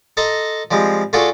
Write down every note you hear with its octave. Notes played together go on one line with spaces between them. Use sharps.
A4 D#5 A5 A#5 C6
F3 G3 G#3 C4
A3 F4 F#4 G#4 A4 D5